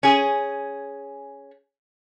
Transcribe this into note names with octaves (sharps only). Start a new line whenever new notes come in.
C#4 G#4